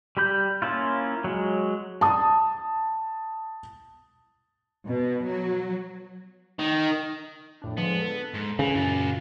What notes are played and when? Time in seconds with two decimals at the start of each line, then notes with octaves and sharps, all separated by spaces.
0.17 G3 G4 B5 G6
0.62 A#3 C#4 E4 F4
1.24 F#3 G#3
2.01 A5 D#6
4.88 B2
5.26 F#3
6.59 D#3
7.62 F2 A2 D4
7.77 D3 F3 G#3 B3
8.02 A4
8.34 G#2
8.59 C#3 E3
8.75 F#2 A#2 F4 G#4